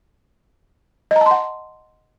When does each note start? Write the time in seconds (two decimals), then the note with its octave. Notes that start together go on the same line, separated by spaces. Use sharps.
1.11 D#5
1.16 A#5
1.21 A5
1.26 C6
1.31 F#5